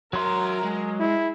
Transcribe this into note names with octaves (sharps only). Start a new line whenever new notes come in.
F#3 F#4 A#4 E5 A#5 C6
G#3
E4 G#4